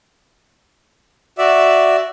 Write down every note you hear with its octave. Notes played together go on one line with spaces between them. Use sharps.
F#4 D5 E5